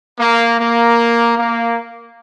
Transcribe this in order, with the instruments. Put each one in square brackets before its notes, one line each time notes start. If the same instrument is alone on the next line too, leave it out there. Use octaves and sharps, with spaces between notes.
[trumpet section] A#3
A#3
A#3